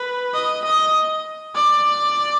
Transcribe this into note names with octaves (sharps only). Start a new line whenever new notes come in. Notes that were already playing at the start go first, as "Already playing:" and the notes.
Already playing: B4
D#5
D#5
D5